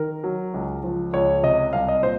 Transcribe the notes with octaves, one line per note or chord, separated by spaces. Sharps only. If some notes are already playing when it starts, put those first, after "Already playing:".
Already playing: D#3 A#4
F#3
C#2
F3
C#2 C#5
C3 D#5
C2 F5
D#5
A#2 C5